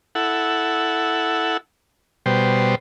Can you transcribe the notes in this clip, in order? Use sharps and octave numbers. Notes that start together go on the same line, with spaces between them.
E4 A4 F#5
B2 G3 C5